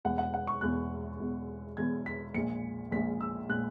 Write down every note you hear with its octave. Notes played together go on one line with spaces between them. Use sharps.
E1 E2 B2 F#5
F#5
F#5
C#6
E1 E2 B2 F#6
E1 E2 B2
E1 E2 B2 G#6
B6
A#1 A#2 G#3 C#7
A#1 A#2 G#3 B6
E6
A#2 G#3 F#6